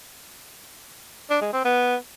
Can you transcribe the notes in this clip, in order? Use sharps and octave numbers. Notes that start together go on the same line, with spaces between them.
D4
G#3
C4
B3